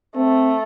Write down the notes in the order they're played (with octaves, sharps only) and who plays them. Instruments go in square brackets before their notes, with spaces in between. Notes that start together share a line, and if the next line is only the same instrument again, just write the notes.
[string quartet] A3 [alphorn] C4